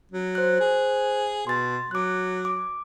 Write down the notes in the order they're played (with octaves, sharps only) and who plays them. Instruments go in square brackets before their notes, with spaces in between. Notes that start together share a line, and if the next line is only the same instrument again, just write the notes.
[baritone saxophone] F#3
[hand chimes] C5 F#6
[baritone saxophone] G#4
[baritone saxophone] B2 [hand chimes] C6 A6
[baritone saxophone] F#3 [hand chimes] D6 F#6
[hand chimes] D6